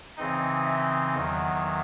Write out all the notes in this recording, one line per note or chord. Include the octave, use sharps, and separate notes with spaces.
C#3 E3 C4 D#4 D#5
E5
E2 D#3 F#3 D#5